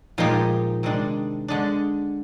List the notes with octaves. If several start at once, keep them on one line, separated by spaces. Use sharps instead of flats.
A#2 F3 G#3 D#4 G4
C3 D#3 G#3 D4
D3 G#3 D4